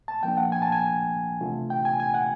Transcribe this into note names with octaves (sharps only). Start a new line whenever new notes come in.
A5
F3 A#3 D4 G5
F#5
G#5
A5
G#5
C3 E3 A3 D4 F4
G5
G#5
G#5
F#5